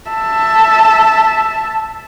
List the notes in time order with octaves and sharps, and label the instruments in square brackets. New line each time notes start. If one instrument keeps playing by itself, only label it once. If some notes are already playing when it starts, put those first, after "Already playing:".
[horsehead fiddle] E5 A5